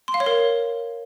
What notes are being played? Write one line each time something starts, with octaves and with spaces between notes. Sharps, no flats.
C6
F5
C#5
A#4